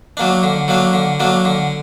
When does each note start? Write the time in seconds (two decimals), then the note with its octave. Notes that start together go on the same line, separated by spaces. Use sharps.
0.17 F#3 A#3 D4
0.43 D3
0.68 F#3 A#3 D4
0.93 D3
1.20 F#3 A#3 D4
1.45 D3